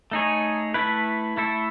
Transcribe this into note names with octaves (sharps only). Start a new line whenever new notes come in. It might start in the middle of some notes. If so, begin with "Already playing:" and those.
A3 D#4 G#4 C#5
A3 E4 B4
A3 E4 A4